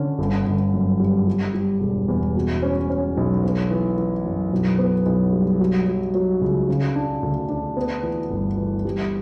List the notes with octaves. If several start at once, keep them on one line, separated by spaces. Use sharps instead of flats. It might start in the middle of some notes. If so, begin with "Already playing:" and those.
Already playing: D3 C#4
G1
G1
F#2
G3
G3
G3
E1
E2
B2
C#4
C#4
B1
B3
E3
E3
F#2
B1
B3
B1
G3
F#3
F#3
F#3
C#2
C#3
D4
D2
D4
B3
E3
G1
E3
G3